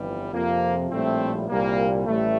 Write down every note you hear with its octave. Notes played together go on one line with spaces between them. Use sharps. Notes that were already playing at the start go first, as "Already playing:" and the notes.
Already playing: G1 F2 E3 G3
F2 C3 F3 A#3
A#1 A2 G3 A3 C4
C2 A#2 G3 A#3
A1 A2 G3 A3